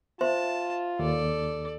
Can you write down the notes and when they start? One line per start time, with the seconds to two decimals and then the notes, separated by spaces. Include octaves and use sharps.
0.21 F4 C5 E5 A5 C6
0.99 D#2 A4 D5